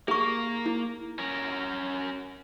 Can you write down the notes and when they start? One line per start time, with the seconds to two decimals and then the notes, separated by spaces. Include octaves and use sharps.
0.08 A#3 G#4 A#4 C#6
0.66 E4
1.19 C#4 A#4